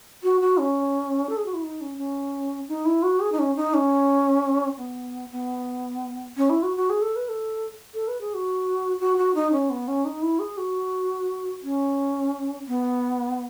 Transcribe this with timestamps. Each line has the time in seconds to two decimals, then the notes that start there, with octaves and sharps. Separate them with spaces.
0.23 F#4
0.41 F#4
0.58 C#4
1.29 A4
1.37 G#4
1.46 F#4
1.54 E4
1.63 D#4
1.81 C#4
1.97 C#4
2.68 D#4
2.85 E4
3.03 F#4
3.20 G#4
3.32 D#4
3.39 C#4
3.56 D#4
3.74 C#4
4.78 B3
5.32 B3
6.37 C#4
6.50 E4
6.63 F#4
6.77 F#4
6.90 G#4
7.02 A4
7.16 B4
7.29 A4
7.94 A4
8.08 B4
8.21 G#4
8.34 F#4
9.00 F#4
9.18 F#4
9.35 D#4
9.52 C#4
9.70 B3
9.88 C#4
10.05 D#4
10.22 E4
10.39 G#4
10.58 F#4
11.63 C#4
12.68 B3